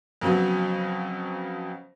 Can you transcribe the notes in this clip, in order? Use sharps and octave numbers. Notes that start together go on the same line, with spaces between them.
F2 C#3 F#3 B3